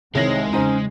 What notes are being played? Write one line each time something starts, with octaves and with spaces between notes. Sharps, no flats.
C2 C3 D#3 G#3 C4 C#5 A#6
E2 C#3 C#4 D#4 C5